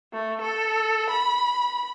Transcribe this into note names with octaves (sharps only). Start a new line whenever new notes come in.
A3
A4
B5